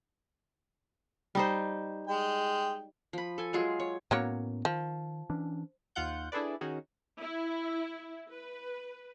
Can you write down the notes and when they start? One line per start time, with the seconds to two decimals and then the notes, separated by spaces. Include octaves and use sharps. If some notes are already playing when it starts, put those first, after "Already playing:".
1.35 G3 D#4 C5
2.07 G#3 G5
3.13 F3 B5
3.38 A4 G#5
3.53 F#3 G#3 F4 G#4
3.80 C#5
4.11 A2 F#3 A#3 B3 C#4 C#5
4.65 D#3 F3
5.30 E3 C#4 D4
5.95 D#2 F4 F#5 G6
6.32 D4 E4 G#4 A4 B4 D5
6.61 D#3 C#4 D#4 F#4 G#4
7.19 E4
8.31 B4